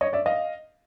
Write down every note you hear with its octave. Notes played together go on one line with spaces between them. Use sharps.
C#5 D#5
D5 E5
D#5 F5